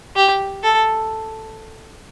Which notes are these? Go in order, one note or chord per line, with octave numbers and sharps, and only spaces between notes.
G4
A4